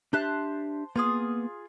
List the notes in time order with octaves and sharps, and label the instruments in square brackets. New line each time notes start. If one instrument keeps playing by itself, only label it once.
[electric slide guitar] D4 G4 E5 [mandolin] C5 A5 F#6
[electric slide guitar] A#3 B3 [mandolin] F4 G#4 D#6